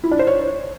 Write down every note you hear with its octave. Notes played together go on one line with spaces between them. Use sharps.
E4
D4
C5
C#5